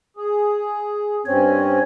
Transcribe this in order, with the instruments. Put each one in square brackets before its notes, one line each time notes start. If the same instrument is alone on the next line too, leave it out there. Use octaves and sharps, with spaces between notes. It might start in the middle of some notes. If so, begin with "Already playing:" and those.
[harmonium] G#4
[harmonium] G2 C4 C#4 [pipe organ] C#5